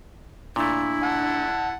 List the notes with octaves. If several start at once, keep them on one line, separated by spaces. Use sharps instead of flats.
A#2 A3 D4 E4
F#5 A5